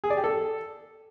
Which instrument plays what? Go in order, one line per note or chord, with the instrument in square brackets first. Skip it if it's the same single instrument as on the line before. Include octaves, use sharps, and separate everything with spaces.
[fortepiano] G#4
D5
G4
A4